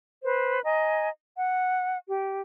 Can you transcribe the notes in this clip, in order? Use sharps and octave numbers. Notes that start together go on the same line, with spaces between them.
B4 C5
D#5 G#5 A#5
F#5
G4